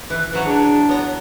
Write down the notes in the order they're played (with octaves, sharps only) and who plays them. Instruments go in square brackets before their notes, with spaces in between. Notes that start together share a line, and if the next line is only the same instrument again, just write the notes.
[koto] E3 [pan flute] F#6
[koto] E3 F#3 C#5 [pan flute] B4
[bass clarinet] D4 [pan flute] G#4
[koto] B3 A#5 [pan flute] C#5